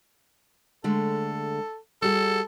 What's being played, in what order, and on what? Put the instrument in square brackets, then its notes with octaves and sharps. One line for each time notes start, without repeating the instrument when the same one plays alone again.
[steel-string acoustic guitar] D3 G#3 A3 [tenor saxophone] A4
[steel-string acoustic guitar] G3 F#4 G#4 [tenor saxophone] A4